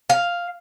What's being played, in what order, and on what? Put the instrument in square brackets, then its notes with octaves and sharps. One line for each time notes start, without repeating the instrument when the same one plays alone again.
[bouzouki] F5